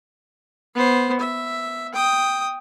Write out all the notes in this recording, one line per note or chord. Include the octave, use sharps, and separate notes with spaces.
B3 C5
E5
G5 D#6